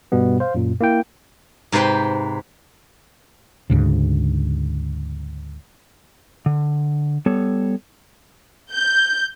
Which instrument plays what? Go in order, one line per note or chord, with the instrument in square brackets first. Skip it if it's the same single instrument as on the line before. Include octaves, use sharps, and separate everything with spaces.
[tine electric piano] G2 B2 G3 B3
C5 F5
F#2 A#2
A#3 E4 G5
[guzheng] G#2 C3 B4 C5 G5
[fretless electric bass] D2 G#2 C#3
[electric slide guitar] D3
G3 B3 A4 C#5
[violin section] G6